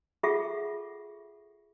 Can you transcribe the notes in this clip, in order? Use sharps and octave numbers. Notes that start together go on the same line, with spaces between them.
F4 G#4 A4 E5 F#5 C#6